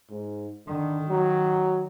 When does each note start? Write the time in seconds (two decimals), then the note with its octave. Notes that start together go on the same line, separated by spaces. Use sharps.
0.10 G#2
0.68 D3 D#3
1.09 F#3